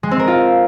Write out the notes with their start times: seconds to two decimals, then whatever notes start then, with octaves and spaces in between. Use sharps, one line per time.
0.03 G#3
0.11 C4
0.19 A#4
0.28 F4